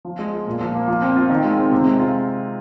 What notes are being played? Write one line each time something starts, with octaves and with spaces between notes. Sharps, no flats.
F3
G#3
F4
A#2
F3
A#3
F3
C4
F4
D#3
G#3
C4
C3
G#3
F4